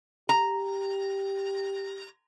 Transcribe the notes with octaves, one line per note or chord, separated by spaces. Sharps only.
G4 A#5